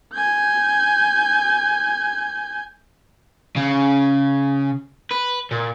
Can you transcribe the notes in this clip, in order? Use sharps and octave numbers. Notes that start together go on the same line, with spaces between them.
G#5 G6
C#3
B4
A#2